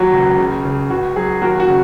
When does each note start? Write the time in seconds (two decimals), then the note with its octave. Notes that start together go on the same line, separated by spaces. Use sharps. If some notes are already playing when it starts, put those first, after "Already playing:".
Already playing: D#2 F#3 F#4
0.13 C#2
0.38 C#3
0.65 C#3
0.90 C#2 F#4
1.16 F#3 G#4
1.41 D#2 F#4 A#4
1.60 F#4
1.68 C#3